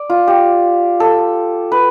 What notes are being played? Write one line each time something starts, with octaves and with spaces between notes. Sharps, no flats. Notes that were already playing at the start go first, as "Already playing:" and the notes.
Already playing: D5
F4
G4
A4
B4